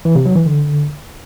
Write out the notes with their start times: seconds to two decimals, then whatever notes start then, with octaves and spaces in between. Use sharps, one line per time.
0.05 E3
0.15 C3
0.26 F#3
0.36 E3
0.46 D3